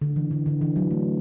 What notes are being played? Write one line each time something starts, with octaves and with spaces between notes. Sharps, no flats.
D3
E3
D3
D3
E3
F#3
A3